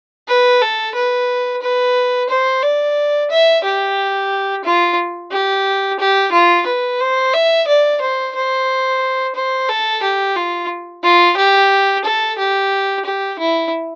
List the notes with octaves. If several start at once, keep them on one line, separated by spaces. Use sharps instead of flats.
B4
A4
B4
B4
C5
D5
E5
G4
F4
G4
G4
F4
B4
C5
E5
D5
C5
C5
C5
A4
G4
F4
F4
G4
A4
G4
G4
E4